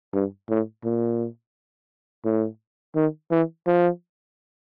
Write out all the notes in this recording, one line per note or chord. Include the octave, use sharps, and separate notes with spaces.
G2
A2
A#2
A2
D#3
E3
F3